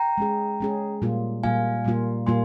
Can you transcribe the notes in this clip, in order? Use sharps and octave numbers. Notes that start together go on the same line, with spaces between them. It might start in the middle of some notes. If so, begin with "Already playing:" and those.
Already playing: G5 A#5
G#3 C#4 G#4
G#3 C#4 G#4
A#2 G3 A#3 F4
A#2 G3 A#3 F4 F5 G#5
A#2 G3 A#3 F4
A#2 G3 A#3 F4 G#5 C6